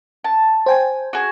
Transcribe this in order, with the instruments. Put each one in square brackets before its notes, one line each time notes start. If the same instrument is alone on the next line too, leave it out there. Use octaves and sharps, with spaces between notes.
[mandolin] A5
[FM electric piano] C5 G5 G#5
[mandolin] F#4 G#4